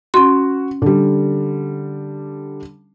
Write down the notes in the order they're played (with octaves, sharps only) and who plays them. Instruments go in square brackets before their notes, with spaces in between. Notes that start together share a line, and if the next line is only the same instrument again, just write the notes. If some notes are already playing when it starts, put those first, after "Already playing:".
[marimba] C#4 C6 [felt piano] F#4
[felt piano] D3 G3